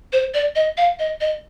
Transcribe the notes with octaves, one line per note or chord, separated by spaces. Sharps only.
C5
D5
D#5
F5
D#5
D#5